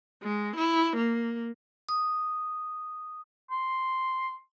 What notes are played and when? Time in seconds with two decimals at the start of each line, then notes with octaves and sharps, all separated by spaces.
0.23 G#3
0.57 E4
0.97 A#3
1.89 D#6
3.51 C6